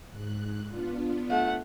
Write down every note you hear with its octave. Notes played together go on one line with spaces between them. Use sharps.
G#2 F#6
B3 D4 F4
A3 F#5